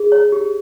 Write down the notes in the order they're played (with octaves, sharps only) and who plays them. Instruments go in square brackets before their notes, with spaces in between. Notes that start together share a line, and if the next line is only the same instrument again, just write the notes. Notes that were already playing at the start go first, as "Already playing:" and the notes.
Already playing: [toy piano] G#4
C#5
G4